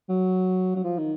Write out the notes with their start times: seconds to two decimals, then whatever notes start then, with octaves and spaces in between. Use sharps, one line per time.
0.09 F#3
0.76 F#3
0.84 F3
0.98 D#3